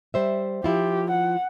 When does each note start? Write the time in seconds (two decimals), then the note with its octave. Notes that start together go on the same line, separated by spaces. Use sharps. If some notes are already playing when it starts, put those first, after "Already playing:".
0.14 G3 C5 E5
0.64 F3 E4 F4 G4
1.11 F#5